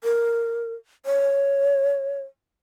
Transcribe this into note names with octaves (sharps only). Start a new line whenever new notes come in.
A#4
C#5